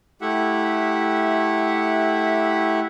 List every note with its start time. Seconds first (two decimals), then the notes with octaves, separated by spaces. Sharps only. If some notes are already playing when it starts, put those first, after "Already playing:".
0.21 A3 E4 G4 E5 F#5